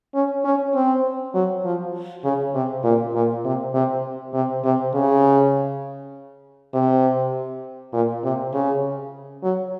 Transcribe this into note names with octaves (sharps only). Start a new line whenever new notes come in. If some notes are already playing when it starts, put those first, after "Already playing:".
C#4
C#4
C4
F#3
F3
C#3
C3
A#2
A#2
C3
C3
C3
C3
C#3
C3
A#2
C3
C#3
F#3